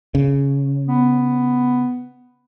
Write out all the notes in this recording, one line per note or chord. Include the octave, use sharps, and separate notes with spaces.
C#3
B3